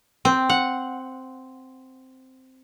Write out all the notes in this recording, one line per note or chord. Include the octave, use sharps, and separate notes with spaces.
C4
F#5